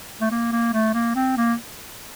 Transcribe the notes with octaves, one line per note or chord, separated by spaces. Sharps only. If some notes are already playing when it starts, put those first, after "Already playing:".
A3
A#3
A#3
A3
A#3
C4
A#3